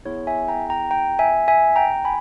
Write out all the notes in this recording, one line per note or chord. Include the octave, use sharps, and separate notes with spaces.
B3 E4 G#4 C#5
E5 G#5
G5 A#5
G5 A#5
G5 A#5
E5 G#5
E5 G#5
G5 A#5
G#5 B5